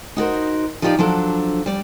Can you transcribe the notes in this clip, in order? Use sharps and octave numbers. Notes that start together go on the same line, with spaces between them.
D#4 F#4 A#4 C5
F3 D#4 F4 G4 C#5 D5
F3 F#3 D4 A4
G3 D5